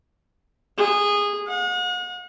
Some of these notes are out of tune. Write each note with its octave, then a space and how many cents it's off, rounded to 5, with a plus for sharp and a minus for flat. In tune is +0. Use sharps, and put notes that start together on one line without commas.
G#4 -15
F#5 -40